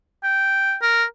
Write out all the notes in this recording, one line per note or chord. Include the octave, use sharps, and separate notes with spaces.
G5
A#4